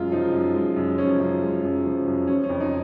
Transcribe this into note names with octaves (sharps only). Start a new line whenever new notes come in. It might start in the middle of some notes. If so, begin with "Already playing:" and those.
Already playing: F#2 G#3 F4
F3 D#4
F#2
G#3
F#2
F3 C#4
F#2
G#3
F#2
F3
F#2
F3 C#4
C#4
F2
D#4